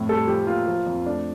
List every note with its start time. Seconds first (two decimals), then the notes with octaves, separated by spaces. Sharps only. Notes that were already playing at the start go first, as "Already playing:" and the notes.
Already playing: F2 A2
0.09 G3 A4
0.28 F3 G4
0.47 A#3 F4
0.68 F3
0.86 F2
1.06 A3 D4